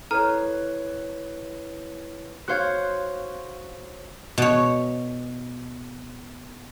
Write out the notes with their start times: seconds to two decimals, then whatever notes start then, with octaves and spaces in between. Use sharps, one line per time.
0.11 E4 A4 B4 C#5 A#5 F6
2.48 F#4 C5 C#5 F5 F#6
4.38 B2 C#5